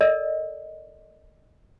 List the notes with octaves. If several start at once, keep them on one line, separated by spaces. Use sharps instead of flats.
A4 A#4 D5 D#5